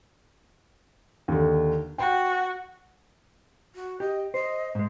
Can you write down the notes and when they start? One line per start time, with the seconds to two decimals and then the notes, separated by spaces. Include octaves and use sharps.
1.28 D#2 D3
1.98 F#4 G5
3.75 F#4
4.00 G4 D#5
4.34 C5 D#5
4.75 G#2 G#3